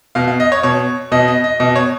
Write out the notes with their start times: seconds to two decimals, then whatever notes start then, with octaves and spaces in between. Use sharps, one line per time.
0.15 B2 F5
0.28 F5
0.40 D#5
0.52 C#5
0.63 B2 C#5
1.12 B2 D#5
1.28 D#5
1.44 D#5
1.60 B2 D#5
1.76 C#5